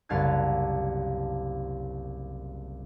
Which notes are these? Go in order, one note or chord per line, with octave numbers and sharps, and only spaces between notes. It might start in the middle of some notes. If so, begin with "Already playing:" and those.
F#1 C2 F5 A5 F#6 G#6